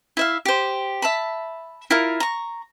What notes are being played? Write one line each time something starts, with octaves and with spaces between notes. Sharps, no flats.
E4 E5 F5
G4 C5
E5 A5 B5
E4 F4 A#4
A#5 C#6